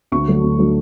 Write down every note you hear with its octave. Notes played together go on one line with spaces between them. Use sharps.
D2 C#6
D3 F#3 A3
D2
D3 F#3 A3